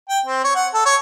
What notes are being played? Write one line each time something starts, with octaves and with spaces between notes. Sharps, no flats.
G5
C4
C#5
F#5
A4
C#5